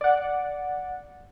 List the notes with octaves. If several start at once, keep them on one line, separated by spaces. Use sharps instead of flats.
D5 F#5